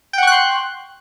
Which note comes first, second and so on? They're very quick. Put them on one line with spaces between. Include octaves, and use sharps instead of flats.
G5 F#5 C#6 F#6 C6